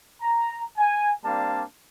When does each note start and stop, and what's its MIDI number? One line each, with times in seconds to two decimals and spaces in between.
0.21 0.63 82
0.77 1.13 80
1.25 1.63 55
1.25 1.63 58
1.25 1.63 60
1.25 1.63 62
1.25 1.63 77
1.25 1.63 81